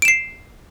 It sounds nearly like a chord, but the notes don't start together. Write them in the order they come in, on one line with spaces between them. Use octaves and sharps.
D7 E7 C7